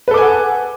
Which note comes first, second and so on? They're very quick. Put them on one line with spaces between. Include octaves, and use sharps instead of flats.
B4 A4 D6 G#5 F#5